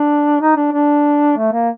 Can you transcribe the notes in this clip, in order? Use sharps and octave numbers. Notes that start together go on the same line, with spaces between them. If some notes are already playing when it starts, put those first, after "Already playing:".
Already playing: D4
D#4
D4
D4
A3
A#3